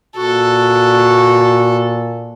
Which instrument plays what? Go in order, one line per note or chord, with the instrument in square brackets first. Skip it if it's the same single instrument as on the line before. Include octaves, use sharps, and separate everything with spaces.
[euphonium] A#2 [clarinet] F#4 [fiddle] A4